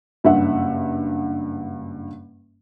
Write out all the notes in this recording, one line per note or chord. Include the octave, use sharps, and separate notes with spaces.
F#1 G2 E5 F#5